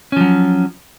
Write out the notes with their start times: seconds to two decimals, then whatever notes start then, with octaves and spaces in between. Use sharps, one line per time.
0.12 C#4
0.16 F3
0.21 F#3